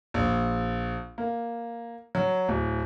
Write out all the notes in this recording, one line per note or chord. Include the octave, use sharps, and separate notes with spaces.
A#1
A#3
F#3
D1